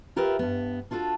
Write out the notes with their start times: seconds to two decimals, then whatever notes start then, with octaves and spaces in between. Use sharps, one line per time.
0.16 F4 G4 A#4 B4 D5 E5
0.39 G2 B3
0.91 D4 F4 F#4 G#4 A4